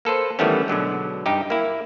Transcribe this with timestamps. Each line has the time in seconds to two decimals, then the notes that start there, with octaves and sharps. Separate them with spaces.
0.05 A#3 A4 B4 C5
0.39 D#3 E3 G3 A3 B3 C#4
0.68 B2 D3 F#3 G#3
1.26 G2 D#4 G4
1.50 A#3 E4